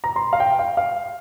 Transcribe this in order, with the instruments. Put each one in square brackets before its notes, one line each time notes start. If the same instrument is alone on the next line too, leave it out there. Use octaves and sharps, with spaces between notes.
[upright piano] A#5
C6
F5
G5
F5
F5